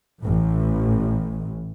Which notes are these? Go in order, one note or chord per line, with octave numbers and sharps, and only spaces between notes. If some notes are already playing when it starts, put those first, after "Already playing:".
A1 A2